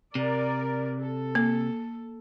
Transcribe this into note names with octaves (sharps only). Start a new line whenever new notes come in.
C3 A#4 D5
A4
A#3